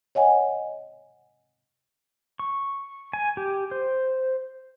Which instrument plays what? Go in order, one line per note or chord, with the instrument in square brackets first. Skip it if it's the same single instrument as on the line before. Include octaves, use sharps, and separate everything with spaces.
[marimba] C#5 D#5 F#5 G#5
[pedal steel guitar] C#6
G#5
G4
C5